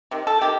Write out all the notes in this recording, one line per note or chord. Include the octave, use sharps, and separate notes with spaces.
C3 D#3
A4
C3 D#3 G4